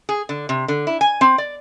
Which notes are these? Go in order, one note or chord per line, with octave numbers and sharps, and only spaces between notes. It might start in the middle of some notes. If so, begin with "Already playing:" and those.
G#4
D3
C3
D3
E4
G#5
C4
D5